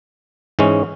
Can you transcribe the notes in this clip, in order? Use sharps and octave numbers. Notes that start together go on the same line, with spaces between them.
G#2 E3 G#3 C#4